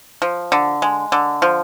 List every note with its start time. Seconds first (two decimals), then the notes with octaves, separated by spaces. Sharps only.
0.22 F3
0.52 D3
0.82 G#3
1.12 D3
1.42 F3